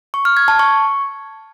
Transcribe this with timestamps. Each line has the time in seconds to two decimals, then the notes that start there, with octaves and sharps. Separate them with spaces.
0.14 C#6
0.25 F6
0.37 G#6
0.48 A5
0.59 C#6